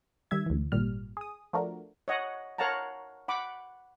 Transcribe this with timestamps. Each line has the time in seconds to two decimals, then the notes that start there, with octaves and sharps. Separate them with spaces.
0.31 D#3 G3 E5 G#6
0.46 D2 E3
0.72 G#1 A#2 G3 F6
1.17 G#4 D#6
1.53 F3 A3 D4 F#4 A#4
2.08 C#5 D#5 F#5
2.58 A#4 C#5 F5 F#5 A5 A#5
3.28 F#5 B5 D6